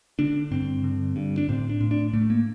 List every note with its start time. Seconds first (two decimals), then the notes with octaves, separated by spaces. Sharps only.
0.19 D3 D4
0.51 G2 C4
0.84 D3
1.16 G2
1.38 D4
1.49 A2 C4
1.69 D4
1.81 A2
1.91 D4
2.13 A2 A3
2.30 A#3